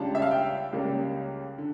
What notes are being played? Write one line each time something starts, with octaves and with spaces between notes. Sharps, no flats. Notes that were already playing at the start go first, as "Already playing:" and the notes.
Already playing: C#2 C#3 G3 D4 F4 A5
E5
F5
G5
C#2 C#3 G3 A#3
D3